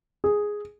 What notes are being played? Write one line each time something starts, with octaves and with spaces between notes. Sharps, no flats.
G#4